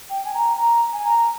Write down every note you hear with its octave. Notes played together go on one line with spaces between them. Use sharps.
G5
G#5
A#5
A#5
G#5
A#5